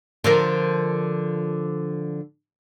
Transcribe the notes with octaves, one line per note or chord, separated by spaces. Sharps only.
D3 F3 A#4